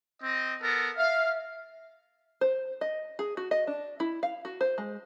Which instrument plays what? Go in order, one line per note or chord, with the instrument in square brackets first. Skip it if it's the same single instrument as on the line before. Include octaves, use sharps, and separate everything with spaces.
[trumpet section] C4 D#5
B3 A4 A#4
[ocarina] E5 [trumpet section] F5
[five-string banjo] C5
D#5
G#4
F#4
D#5
D4
E4
F5
F#4
C5
G#3